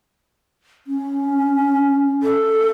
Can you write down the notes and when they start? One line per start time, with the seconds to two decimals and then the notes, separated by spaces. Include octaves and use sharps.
0.87 C#4
2.23 A4